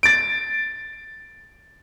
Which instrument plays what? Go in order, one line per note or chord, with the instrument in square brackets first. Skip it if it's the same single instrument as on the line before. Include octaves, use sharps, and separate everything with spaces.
[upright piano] A6 D7